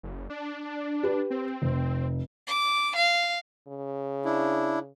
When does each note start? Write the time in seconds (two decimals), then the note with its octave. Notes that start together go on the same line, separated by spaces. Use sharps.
0.03 F#1
0.30 D4
1.03 G4 B4
1.30 C4
1.62 F1
2.47 D6
2.96 F5
3.68 C#3
4.25 D4 E4